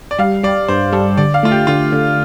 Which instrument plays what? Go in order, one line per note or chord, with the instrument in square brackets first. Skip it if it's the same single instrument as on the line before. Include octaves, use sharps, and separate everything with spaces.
[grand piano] D5
[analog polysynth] G3 [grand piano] F5
[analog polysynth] G3 [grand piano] D5
[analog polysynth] G2 [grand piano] C5
[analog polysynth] G3 [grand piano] A4
[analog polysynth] D3 [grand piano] D5
[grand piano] F5
[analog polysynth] A3 [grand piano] F4
[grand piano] G4
[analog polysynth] D3 [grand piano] F4
[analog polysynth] D3